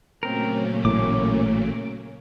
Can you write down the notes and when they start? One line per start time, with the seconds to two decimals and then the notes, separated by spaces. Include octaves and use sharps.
0.23 A#2 C#3 F#3 A3 A#3 C4 C#4 A#4
0.85 A1 A2 D6